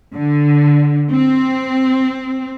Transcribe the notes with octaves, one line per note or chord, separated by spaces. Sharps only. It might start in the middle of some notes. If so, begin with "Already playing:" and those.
D3
C4